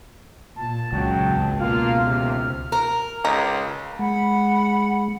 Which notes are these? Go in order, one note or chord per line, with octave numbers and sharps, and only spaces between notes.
A#2 A5
C#2 C#3 F#3 G5
G#1 D#2
B2 A#3 F4 F6
D#2 C3
A#4
C#2 D#4
G#3 F#5 B5